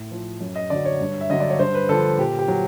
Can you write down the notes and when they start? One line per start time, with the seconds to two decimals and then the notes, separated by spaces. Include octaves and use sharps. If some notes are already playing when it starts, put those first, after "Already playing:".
Already playing: A2
0.11 F3
0.41 F#2
0.55 D#5
0.70 D3 F#3 D5
0.85 C#5
1.01 G2
1.21 E5
1.30 D3 F#3 D#5
1.40 D5
1.50 C#5
1.59 G2 C5
1.75 B4
1.89 D3 F3 A4
2.18 A#2 G4
2.39 G4
2.48 F#3